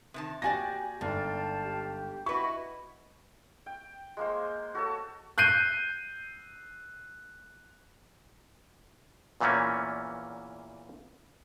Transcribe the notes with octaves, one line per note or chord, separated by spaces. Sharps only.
C3 D#3 A5
A#3 F#4 G4 D5 G#5 A#6
G1 G#2 D5 F5 G5 A5
G4
E4 F#4 B4 D#5 C#6
G5
G#3 A#3 C5
F#4 A4 C#5 A5
F#6 G6 C7 D#7
E2 A#2 E3 A3 A#3 C#4